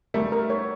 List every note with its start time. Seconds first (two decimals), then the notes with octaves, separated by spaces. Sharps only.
0.14 G3 A3 A#4
0.32 A#4
0.50 C#5